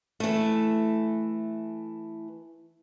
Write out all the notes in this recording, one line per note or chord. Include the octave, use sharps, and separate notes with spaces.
E3 A3